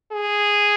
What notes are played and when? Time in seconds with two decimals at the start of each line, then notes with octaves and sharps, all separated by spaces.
0.12 G#4